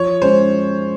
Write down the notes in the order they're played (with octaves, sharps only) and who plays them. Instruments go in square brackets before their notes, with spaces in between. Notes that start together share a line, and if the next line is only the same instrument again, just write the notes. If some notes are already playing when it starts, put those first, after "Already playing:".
Already playing: [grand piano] F3 [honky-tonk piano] C#5
[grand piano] G#3 C#4 F4 [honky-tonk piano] C5